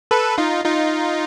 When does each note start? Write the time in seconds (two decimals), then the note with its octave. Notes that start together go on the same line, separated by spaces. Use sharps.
0.11 A4 B4
0.38 D#4 F4
0.65 D#4 F4